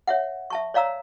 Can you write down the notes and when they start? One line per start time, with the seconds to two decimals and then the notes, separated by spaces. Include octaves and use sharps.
0.07 C#5 E5 F#5
0.50 E5 A5 C#6
0.74 C#5 D5 F5 A#5 E6